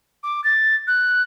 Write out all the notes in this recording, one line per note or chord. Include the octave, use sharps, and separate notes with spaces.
D6
A6
F#6